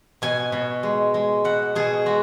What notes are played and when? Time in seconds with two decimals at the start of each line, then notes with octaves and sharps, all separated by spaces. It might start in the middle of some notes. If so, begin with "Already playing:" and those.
0.22 B2 G#5
0.52 B2
0.83 G#3
1.14 G#3
1.44 B2 F#5
1.75 B2 G#4
2.06 G#3 F#4